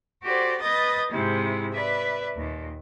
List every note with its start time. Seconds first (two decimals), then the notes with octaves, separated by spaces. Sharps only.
0.23 F#4 G4 A4 C5 D5
0.60 B4 D#5 D#6 G6 A6
1.10 G#2 C3 G#3 E4
1.73 B4 D5 E5
2.37 D#2 A#2